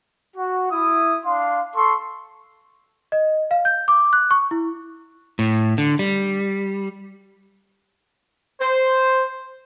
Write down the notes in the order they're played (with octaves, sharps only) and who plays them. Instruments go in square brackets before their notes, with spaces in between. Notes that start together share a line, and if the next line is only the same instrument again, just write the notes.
[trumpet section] F#4
E4 D#6
D4 F5 C6
A4 C6 C#6
[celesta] D#5
F5
G6
D6
F#6
C#6
E4
[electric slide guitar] A2
D3
G3
[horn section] C5